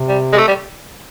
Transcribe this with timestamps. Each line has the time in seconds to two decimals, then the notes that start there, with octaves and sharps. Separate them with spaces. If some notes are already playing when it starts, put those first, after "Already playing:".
Already playing: C3
0.09 G3
0.33 G#3
0.38 A3
0.48 G3